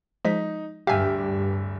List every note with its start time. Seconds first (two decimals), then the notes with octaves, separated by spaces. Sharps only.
0.25 F3 G#3 D#4 B6
0.87 D1 G2 G4 E5 F5 G#5 F6